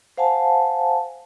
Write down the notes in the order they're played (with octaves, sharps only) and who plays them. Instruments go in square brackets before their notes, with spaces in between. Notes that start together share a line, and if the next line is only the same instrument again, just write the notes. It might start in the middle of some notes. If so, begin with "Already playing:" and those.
[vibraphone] C5 F5 F#5 G#5 A5